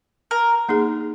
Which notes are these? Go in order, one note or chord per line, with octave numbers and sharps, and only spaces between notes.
A#4
A#3 D#4 G#4